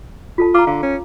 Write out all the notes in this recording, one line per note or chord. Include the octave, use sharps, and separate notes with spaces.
F4 A4 A5
F4 A#5 D6
D3 F5
C#4